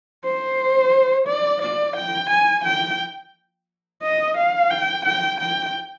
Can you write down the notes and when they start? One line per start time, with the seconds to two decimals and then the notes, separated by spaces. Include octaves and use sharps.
0.24 C5
1.28 D5
1.62 D5
1.96 G5
2.30 G#5
2.65 G5
4.03 D#5
4.37 F5
4.71 G5
5.05 G5
5.40 G5